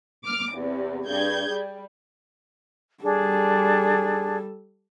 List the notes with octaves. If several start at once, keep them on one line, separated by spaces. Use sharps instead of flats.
D6 F6
E2 C3
G2 G#4 G6 G#6
G3
G3 D4 G#4 A4